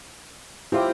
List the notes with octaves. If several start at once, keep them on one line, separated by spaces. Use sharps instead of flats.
C4 E4 F4 G4